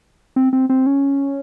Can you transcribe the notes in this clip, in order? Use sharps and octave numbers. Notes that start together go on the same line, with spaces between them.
C4
C4
C4
C#4